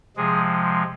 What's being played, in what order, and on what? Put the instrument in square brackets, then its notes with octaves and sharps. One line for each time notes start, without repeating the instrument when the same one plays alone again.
[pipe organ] C3 F3 G#3 G#4